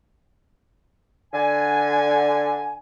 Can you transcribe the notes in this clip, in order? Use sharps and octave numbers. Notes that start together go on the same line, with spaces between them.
D3 G#5